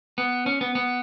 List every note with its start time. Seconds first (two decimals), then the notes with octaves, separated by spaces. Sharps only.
0.18 B3
0.46 C#4
0.61 B3
0.75 B3